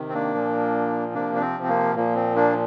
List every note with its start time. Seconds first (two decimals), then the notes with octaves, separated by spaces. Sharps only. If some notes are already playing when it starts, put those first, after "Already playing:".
Already playing: C3 D#3
0.09 C4
0.14 A#3 D4
0.34 A#2 F3
1.14 C3 F3 A#3 D4
1.35 D4
1.41 C4
1.63 C4
1.69 A#3
1.95 A#2 F3 A#3
2.15 C4
2.36 A#3 D4